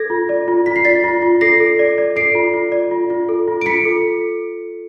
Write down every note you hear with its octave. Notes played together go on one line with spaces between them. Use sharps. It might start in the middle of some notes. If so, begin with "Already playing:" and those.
Already playing: A4 G#6 A#6
F4
D5
F4
F4 B6
C7
D5 A6 B6
F4
F4
A4 A#6 C7
A4
D5
D5
A4 C7 D7
F4
F4
D5
F4
F4
A4
F4
D7
F4 B6 C#7
A4